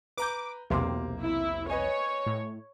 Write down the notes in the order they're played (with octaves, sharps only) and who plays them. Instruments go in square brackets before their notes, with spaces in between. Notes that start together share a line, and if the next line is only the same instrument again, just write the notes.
[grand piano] B4 A#5 G6 [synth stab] D6
[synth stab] B1 E2 C3 [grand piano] A#3 C6 D6
[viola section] E4
[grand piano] B4 D#5 G#5 [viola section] C#5
[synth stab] A2